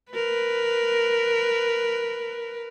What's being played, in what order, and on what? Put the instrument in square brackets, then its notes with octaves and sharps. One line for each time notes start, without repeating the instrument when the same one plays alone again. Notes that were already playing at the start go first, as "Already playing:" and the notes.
[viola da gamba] A#4 B4